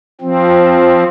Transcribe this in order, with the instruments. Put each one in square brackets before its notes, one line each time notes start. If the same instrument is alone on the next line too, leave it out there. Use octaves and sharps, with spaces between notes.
[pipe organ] F3 C4